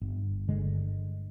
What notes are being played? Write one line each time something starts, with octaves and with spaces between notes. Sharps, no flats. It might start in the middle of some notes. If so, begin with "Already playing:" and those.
G1
G2 D3 G#3